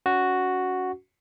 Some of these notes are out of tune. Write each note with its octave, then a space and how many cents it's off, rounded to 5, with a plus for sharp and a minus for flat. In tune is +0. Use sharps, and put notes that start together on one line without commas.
C#4 +30 F#4 +0